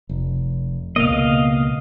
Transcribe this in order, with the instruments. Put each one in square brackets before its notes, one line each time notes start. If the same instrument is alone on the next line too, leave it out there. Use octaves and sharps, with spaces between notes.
[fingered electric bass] F1
[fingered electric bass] C#2 B2 A#3 [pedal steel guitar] D#5 F5